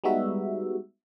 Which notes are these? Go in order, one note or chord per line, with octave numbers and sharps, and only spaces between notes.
G3 G#3 B3 D#4 F#4 E5